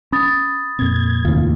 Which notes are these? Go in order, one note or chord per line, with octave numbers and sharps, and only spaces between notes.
C#4 B5 D#6 A6
F2 A#2 C4 G#6
D#2 A2 C3 E3 F4